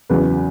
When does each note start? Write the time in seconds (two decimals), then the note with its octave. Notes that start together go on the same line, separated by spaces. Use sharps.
0.10 E2 C#3 F#3 B4